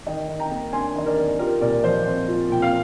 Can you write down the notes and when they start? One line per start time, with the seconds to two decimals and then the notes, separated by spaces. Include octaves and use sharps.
0.06 D#3 D#5 G5
0.28 D#3
0.39 G5 A#5
0.51 A#3
0.73 D4 G#5 C6
0.95 D#3 D#5
1.06 A#4 D5
1.17 D#3
1.39 F4 G4 A#4
1.61 A#2 A#4 D5
1.84 F3 C5 D#5
2.06 C4
2.28 F4
2.50 A#2 G5
2.62 F5